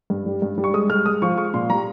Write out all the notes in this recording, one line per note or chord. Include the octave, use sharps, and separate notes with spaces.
G2
G3
G2
G3
C#6
G#3 D#6
G#3 F6
G#3 D#6
F3 C#6
G#3 C#6
A#2 C6
G3 A#5